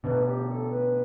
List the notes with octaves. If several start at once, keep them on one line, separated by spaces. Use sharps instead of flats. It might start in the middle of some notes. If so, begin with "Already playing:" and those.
B2 D3 B4
G4
A4
B4